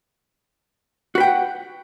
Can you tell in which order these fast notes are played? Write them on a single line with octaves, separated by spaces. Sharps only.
F#4 B4 G5 F#5